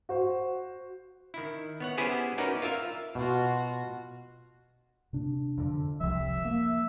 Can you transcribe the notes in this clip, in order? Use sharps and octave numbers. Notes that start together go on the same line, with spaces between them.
F#4 C5
D#3 E4
B3 C#5 F#5
B3 C#4 E4 G4 G#4 C5
C#4 D#4 F#4 A#4 B4 D5
F4 A#4 E5 F5
B2 F4 F#4
C3 D4
F2 D3
F1 C2 F3 E5
A#3